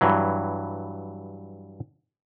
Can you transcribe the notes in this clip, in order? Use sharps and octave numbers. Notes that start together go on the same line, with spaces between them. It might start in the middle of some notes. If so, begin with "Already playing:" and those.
G2 E3 F#3